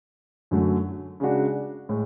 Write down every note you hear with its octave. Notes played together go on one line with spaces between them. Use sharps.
F#2 D3 F#3 A3
C#3 G#3 D4 F#4
A2 G#3